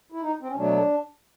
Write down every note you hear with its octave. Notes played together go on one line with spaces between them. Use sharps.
E4
D#4
C4
C#4
B2 F#3 A3 D4